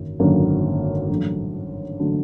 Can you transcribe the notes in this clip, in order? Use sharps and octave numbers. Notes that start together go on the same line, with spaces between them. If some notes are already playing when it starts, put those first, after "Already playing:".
Already playing: G#1 F#2 D3 A#3
G#1 F#2 D3 F#3 A#3
A1 G2 D3 F#3 A3
D3 F#3 A3